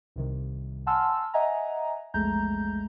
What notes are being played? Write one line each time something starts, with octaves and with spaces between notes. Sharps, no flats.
C2 C3 D#3
F#5 G#5 A5 C6 E6 F6
D#5 E5 F#5 G#5 A#5
A#1 E2 G#3 A3 A#5 G6